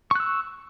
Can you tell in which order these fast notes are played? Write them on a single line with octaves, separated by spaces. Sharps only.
C#6 F#6 E6